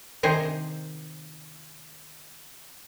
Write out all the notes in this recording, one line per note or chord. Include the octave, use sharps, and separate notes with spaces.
C3 D#3 G#4 C5